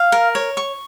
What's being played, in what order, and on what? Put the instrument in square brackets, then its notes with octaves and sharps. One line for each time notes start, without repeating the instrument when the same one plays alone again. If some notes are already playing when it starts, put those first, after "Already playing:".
Already playing: [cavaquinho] F5
A#4
C#5
C#6